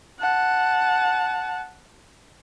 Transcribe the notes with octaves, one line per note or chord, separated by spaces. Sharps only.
F#5 A5